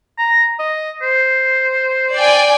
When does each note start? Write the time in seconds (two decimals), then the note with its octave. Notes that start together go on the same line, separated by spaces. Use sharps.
0.18 A#5
0.59 D#5
1.02 C5
2.14 D5 G5 G#5